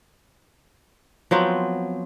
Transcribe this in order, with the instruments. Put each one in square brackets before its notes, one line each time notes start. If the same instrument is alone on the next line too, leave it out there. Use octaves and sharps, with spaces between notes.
[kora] F3 F#3 B3 C4